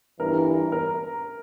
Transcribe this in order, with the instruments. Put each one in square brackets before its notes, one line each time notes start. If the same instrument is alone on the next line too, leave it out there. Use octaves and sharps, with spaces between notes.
[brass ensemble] G1 G2 E3 [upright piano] A#4
[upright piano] A#4